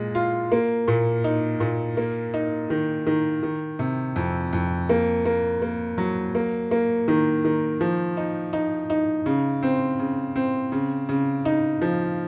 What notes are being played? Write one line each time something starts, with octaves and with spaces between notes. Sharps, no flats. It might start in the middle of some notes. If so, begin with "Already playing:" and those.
Already playing: A#2 G#3
F4
A#3
A#2
D#4
A#2
A#3
D#4
D#3
D#3
D#3
C3
F2
F2
A#3
A#3
A#3
F#3
A#3
A#3
D#3
D#3
F3
D#4
D#4
D#4
C#3
C4
C#3
C4
C#3
C#3
D#4
F3